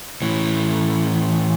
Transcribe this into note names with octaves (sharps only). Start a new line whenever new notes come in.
A2 E3